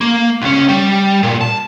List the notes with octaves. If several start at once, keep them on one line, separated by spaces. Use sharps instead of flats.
A#3
C#2 C#4
G3
A#2
A5